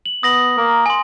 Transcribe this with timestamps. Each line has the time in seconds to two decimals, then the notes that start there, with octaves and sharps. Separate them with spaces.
0.06 F#7
0.23 B3 D#6 A#6 F#7
0.57 A#3 A#4
0.86 G#5 C6